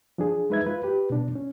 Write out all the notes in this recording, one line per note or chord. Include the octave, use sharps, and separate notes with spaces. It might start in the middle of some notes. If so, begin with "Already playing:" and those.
F3 D4 G#4
G#3 D#4 B4 E5 G#6
F4 B4
G4 B4
B2 D4
C#4